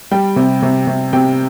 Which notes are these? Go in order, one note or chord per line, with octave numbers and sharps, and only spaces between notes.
G3 G5
C3
C3
C3
C3 G5